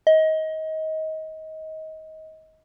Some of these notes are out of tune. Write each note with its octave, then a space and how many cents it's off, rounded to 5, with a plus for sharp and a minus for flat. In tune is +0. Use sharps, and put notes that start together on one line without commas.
D#5 +25